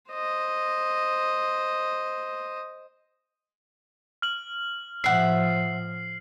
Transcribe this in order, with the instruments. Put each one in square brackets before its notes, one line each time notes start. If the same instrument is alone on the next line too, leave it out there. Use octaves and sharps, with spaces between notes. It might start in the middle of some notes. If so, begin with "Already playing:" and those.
[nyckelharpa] C5 D#5
[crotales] F6 F#7
[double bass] A2 F3 [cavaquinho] E5 F#5 [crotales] C7